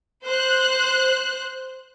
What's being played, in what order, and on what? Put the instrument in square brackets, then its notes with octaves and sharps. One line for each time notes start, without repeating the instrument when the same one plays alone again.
[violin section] C5 F#6